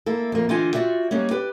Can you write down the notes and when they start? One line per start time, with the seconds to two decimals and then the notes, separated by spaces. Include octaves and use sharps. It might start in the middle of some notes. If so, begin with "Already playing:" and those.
0.06 A#3 E4 A4
0.32 F2 A#3
0.49 D3 E3 F4 D#5 G5 G#5
0.73 F4 F#4 D5 E5 G5
1.11 G3 G#3 A#3 C#4
1.31 G4 B4 D5